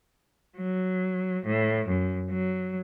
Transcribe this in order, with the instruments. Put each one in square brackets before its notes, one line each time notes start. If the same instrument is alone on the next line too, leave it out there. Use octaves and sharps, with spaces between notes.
[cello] F#3
A2
F#2
F#3